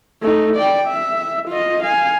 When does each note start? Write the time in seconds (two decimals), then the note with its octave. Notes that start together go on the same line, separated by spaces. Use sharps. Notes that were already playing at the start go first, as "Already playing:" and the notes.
0.22 A3 D#4
0.56 D5 G5
0.88 E5
1.48 F4 D#5
1.83 F5 G#5